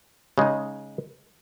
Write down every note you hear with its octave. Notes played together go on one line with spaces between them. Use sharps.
C#3 G#3 D#4